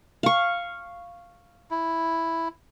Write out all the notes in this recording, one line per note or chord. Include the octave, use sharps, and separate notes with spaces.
F5 C#6
E4